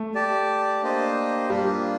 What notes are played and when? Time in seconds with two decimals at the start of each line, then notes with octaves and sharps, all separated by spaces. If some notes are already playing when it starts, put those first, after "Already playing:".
Already playing: A3
0.15 G4 D5 A5
0.82 A#3 D4 G4 C5 D#5
1.49 G3 A#3 D4 F4